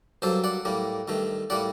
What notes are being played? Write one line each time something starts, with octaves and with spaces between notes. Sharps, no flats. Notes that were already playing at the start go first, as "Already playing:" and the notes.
G2 F#3 A#3 A4 C5
D5 F#5
A2 G3 A#3
G2 D#3 A3
A2 G3 A#3 D5 F#5